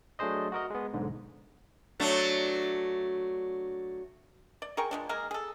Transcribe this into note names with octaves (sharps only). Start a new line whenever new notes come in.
F#3 A3 D4 G#4 C5 D#5
F#4 A#4 D#5
G#3 B3
B1 G#2 D3
F#3 A3 D4
D5
G#4 A#4 G5 C#6
F3 G#3 D4
G#3 A#3 G#4 A#4
G#4 A4